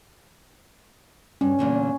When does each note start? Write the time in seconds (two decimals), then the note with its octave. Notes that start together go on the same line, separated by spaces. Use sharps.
1.41 G2 C#4
1.59 E2 A#2 D3